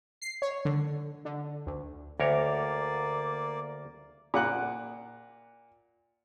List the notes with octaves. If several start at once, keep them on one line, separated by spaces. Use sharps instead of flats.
C7
C#5
D3
D3
D2
D2 A#3 A#4 C#5 D5
A#2 F#5 F#6